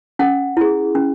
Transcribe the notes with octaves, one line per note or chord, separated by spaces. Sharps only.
C#4 F#5
E4 G#4
C#4